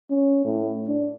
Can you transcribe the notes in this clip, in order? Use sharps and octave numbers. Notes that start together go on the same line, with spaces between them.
C#4
A2
D4